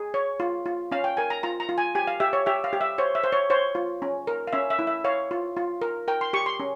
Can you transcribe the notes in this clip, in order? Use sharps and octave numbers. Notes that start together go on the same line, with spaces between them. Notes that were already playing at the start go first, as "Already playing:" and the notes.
Already playing: G#4
C#5
F4
F4
C#4 F5
G5
A#4 G#5
A#5
F4 A#5
A#5
F4
G#5
G4 G#5
F5
G4 E5
C#5
G4 E5
F5
G4
E5
C5 C#5
E5
C5
C#5
C5 C#5
F4
C#4
A#4
F5
C#4 E5
E5
E4
E5
C#5 F5
F4
F4
A#4
A#4 G5
C6
G4 C#6
C6
C#4